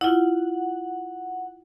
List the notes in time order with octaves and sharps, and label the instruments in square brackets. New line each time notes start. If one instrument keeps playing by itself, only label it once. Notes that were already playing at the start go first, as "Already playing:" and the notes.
[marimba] E4 F4 [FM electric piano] F#5